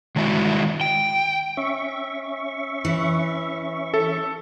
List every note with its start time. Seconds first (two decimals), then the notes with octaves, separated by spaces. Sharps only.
0.16 D#3 G#3 E4 F#4
0.81 G5
1.57 C#4 E5 C#6
2.85 E3
3.94 A4